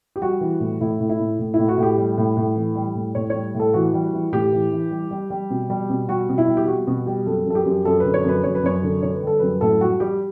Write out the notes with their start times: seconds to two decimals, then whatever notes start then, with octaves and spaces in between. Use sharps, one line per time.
0.16 G4
0.21 G3 F#4
0.41 E3
0.60 A2
0.80 A2 E4
1.00 A2
1.09 E4
1.19 A2
1.39 A2
1.54 A2 E4
1.68 F#4
1.78 A2 G4
1.98 G3
2.18 A2
2.37 A2
2.56 E3
2.75 G3
2.95 A2
3.15 A2 C#5
3.30 G3 C#5
3.54 A2
3.60 A4
3.74 E3 F#4
3.94 G3
4.13 E3
4.33 A2 G4
4.52 E3
4.72 E3
4.91 G3
5.11 G3
5.30 G3
5.50 B2
5.70 G3
5.90 B2
6.09 G3 F#4
6.29 B2
6.38 E4
6.47 G3
6.57 G4
6.67 G3 F#4
6.87 B2 F#4
7.06 G3 G4
7.26 F#2 A4
7.46 F#2 A4
7.55 G4
7.65 F#2
7.85 F#2 A4
8.00 D3 B4
8.14 C#5
8.24 F#2 B4
8.44 F#2 C#5
8.55 B4
8.63 F#2 C#5
8.83 D3
9.02 D3 C#5
9.15 B4
9.22 G3
9.27 A4
9.39 F#2 B4
9.61 A2 A4
9.81 G3 F#4
10.00 G3 G4